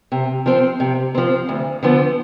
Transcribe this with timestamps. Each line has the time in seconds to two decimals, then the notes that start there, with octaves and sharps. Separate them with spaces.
0.12 C3
0.46 F3 C4
0.80 C3
1.15 F3 C4
1.49 D2
1.83 D3 F3 B3